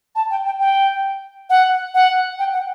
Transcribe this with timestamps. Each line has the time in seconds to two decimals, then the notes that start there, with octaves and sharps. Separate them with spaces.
0.15 A5
0.30 G5
0.46 G5
0.59 G5
1.50 F#5
1.94 F#5
2.39 G5
2.53 F#5